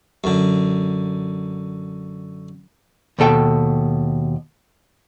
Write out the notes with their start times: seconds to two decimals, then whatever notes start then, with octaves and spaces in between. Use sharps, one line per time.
0.24 F#2 D3
3.19 D#2 B2 A4 G5